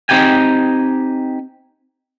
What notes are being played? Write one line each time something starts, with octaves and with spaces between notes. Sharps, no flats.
C4 D4 D#4 G4 G5 G#5